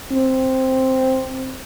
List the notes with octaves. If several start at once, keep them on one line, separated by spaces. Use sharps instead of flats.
C4